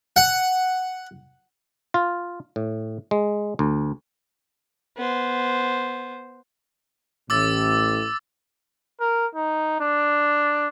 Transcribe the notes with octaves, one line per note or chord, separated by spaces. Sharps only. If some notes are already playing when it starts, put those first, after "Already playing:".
F#5
F4
A2
G#3
D2
B3 C5
A1 A2 D6 E6 A6
A#4
D#4
D4